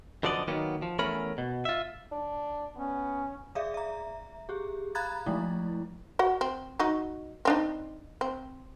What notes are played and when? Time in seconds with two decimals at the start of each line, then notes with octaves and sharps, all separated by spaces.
0.23 F#2 D3 F3 B3 D5 D#5
0.48 D#3 F#3 A#3 B3
0.82 F3
0.99 E2 A3 C#4 A#4 B5
1.38 B2
1.65 F4 E5
2.12 D4
2.76 B3 C#4
3.55 G#4 D5 E5 F5
3.74 E5 A#5
4.49 G4 G#4
4.95 F5 A#5 B5 F#6 G#6 A6
5.26 F3 G#3 A3 E4
6.19 F#4 F#5
6.41 C4
6.79 F#3 D#4 F#4
7.45 C4 D4 D#4
8.21 C4